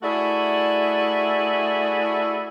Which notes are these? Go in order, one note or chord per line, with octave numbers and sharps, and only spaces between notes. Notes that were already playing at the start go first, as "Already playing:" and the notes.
A3 E4 F#4 G#4 D5